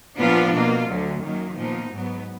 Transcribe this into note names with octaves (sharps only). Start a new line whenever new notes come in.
A#2 F3 B3 D4 F4
B2 A#3 F4
D2 D3 F#3
F#2 D#3 F#3 A#3
A#2 F3 B3 D#4
G#2 F#3 B3